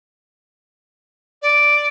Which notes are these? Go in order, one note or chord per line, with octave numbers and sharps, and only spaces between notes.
D5